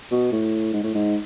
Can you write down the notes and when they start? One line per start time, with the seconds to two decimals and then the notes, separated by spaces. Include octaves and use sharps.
0.11 B2
0.32 A2
0.73 G#2
0.84 A2
0.94 G#2